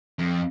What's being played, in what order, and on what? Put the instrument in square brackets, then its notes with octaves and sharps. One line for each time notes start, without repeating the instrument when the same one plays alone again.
[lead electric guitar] F2